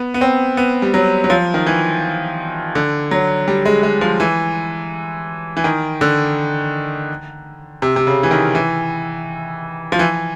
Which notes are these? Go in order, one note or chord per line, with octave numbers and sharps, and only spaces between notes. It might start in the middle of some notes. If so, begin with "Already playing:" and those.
Already playing: B3
B3
C4
B3
G3
F#3
F#3
F3
D#3
E3
D3
F#3
G3
G#3
G#3
F3
E3
E3
D#3
D3
C3
C3
C#3
E3
D#3
E3
F3
E3